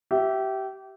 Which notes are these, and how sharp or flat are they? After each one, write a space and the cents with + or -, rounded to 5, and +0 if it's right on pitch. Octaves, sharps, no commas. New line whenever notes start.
G4 -25 E5 +0